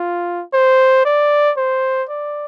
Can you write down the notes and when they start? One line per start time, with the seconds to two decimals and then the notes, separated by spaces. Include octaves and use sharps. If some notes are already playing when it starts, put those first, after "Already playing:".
Already playing: F4
0.54 C5
1.06 D5
1.57 C5
2.09 D5